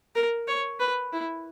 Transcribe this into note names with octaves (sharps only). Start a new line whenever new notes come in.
A#4
C#5
B4
E4